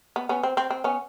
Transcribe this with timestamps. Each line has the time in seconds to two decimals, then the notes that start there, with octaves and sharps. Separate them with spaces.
0.16 B3
0.29 B3 C#4
0.43 C4
0.57 C4
0.70 C4
0.84 B3 C#4